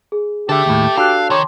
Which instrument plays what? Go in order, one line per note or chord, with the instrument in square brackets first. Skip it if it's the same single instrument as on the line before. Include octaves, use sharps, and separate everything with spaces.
[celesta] G#4
[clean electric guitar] D3 [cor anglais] G4 [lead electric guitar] A4 E5
[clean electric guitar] D#2 A2
[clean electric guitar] D4 A4 [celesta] F#4 F#6 [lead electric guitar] F5
[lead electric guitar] D#3 [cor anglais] C#5 [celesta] A5 C6 D6